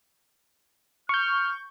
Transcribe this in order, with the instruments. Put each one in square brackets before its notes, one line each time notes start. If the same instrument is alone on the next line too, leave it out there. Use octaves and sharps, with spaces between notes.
[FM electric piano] C#6 G6 [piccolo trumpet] F6